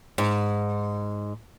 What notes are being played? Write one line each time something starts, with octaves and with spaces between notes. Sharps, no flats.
G#2